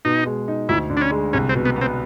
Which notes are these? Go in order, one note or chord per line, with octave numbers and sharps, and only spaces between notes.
B2 D#4
G#3
D#4
D2 E4
D3
D4
C#4
G#3
C2 C#4
C4
B2
B3
B3
C4